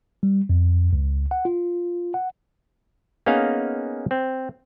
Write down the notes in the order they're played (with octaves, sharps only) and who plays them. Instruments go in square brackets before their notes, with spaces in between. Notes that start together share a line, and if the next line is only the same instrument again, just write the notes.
[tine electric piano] G3
F2
C#2
F#5
F4
F#5
[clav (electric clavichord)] A#3 B3 C#4 D#4 G#4 F5
C4